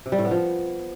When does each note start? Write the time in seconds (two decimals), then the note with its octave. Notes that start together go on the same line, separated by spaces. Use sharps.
0.06 C3
0.12 G3
0.18 A2
0.25 B3
0.31 F3